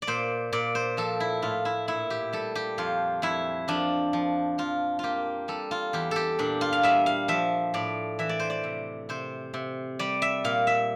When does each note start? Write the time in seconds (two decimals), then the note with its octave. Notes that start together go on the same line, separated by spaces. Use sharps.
0.02 D5
0.07 A#2 C5
0.52 A#2 D5
0.75 C5
0.97 F3 A4
1.20 E4
1.42 A2 F4
1.65 E4
1.88 A#2 E4
2.10 G4
2.33 G3 A4
2.55 G4
2.78 F2 F4
3.22 F2 E4
3.68 F3 D4
4.13 F3
4.58 F3 F4
4.99 A#3 F4 G4
5.48 G3 A4
5.71 F4
5.93 E2 G4
6.11 G4 A4
6.39 A#2 D4
6.61 F4
6.73 F5
6.83 G3 E5
7.06 F5
7.28 F3 E5
7.74 A2 D5
8.19 E3 E5
8.29 D5
8.39 C5
8.50 D5
8.64 C3
9.09 C3 C5
9.54 C3
9.99 G3 D5
10.22 E5
10.44 A#2 F5
10.67 E5